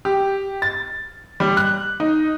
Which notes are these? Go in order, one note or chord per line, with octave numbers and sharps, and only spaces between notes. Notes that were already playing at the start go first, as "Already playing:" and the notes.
G4
A6
G3
F#6
D#4